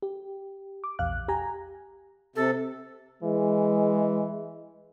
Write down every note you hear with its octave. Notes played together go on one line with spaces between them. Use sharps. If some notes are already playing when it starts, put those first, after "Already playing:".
G4
D6
A#1 E2 F5 F#6
G4 G#5 A#5
C3 A4
E3 G#3